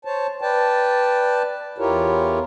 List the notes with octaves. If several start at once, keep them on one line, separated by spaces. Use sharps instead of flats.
C5 C#5 A5
B4 D5 G5 A5
E2 E4 F4 G4 A#4 C#5